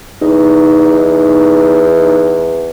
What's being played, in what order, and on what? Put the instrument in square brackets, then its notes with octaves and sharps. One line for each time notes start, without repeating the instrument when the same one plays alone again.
[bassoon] E2 [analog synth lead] D#4